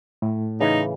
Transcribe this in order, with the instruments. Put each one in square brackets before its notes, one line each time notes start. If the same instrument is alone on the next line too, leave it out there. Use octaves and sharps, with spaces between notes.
[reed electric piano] A2
[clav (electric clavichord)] C#3 E3 [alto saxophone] D#4